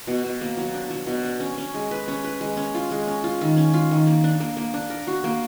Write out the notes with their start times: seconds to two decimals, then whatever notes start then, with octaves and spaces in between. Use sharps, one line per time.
0.07 B2
0.24 B2
0.41 A#3
0.57 F#3
0.74 D4
0.90 F#3
1.07 B2
1.23 D4
1.40 C#4
1.58 C#4
1.74 G#3
1.91 B4
2.08 C#4
2.24 B4
2.41 G#3
2.57 C#4
2.74 F4
2.91 G#3
3.07 C#4
3.24 F4
3.41 D#3
3.57 C#4
3.73 F4
3.91 D#3
4.07 A#3
4.24 D4
4.40 A#3
4.57 A#3
4.74 D4
4.90 A#4
5.07 F#4
5.24 A#3